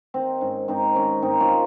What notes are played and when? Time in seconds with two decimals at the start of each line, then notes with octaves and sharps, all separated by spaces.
0.14 D#3 C4
0.41 G#2 C#4
0.68 G#2 C4 D#4
0.96 D#3 C#4
1.22 G#2 C4 D#4
1.40 C#4 F4
1.49 A#3